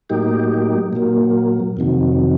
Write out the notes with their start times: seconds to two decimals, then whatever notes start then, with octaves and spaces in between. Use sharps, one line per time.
0.10 A2 F#3 A#3 D#4 G4
0.93 A#2 F#3 A#3
1.77 F2 C3 D#3 F#3